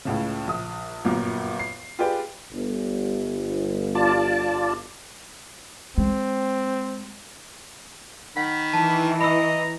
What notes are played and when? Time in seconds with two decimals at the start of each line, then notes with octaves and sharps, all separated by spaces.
0.05 C#2 A2 C#3
0.47 A#1 D#6
1.05 G1 F#2 A#2 A#3
1.59 C7
1.99 F4 G4 G#4 B4 D5 G5
2.52 G1
3.95 F4 D5 A5
5.98 G#3 C4
8.37 D#3 F#5 B5
8.73 E3 A5
9.21 D#5 A#5 B5 E6